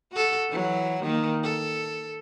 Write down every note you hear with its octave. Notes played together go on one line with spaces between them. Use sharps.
F#4 A4
E3 F#3
D#3 A#3
A4